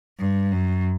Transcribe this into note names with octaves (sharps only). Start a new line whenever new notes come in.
G2
F#2